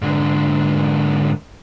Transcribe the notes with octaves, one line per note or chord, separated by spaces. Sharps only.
G#2 D3